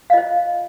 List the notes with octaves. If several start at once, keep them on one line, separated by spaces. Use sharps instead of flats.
F5
F4 C5 D#5